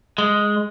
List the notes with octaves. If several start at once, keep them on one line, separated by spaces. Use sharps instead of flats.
G#3